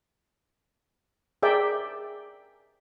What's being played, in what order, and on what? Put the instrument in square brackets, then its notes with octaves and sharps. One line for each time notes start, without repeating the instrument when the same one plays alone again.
[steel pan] G#4 A#4 D5 E5 G5